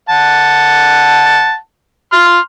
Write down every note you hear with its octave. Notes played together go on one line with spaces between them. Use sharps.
F#5 A5
C6 F6